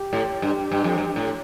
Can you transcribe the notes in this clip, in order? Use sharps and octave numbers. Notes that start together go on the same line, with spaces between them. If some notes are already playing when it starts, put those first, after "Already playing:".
Already playing: G4
A2
G2
G2
F2
G2
A2